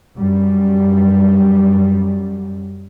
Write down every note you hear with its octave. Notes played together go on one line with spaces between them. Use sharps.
F#2 G3